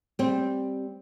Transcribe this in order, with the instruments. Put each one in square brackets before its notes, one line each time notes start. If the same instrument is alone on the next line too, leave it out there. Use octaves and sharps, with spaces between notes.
[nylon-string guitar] G3 C4